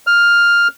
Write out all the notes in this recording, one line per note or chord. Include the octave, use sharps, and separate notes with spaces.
F6